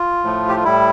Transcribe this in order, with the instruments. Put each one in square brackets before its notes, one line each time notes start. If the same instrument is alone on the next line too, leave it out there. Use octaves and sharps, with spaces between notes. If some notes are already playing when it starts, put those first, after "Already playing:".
Already playing: [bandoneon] F4
A2 F3 A3
G4
F4
A2 G3 E4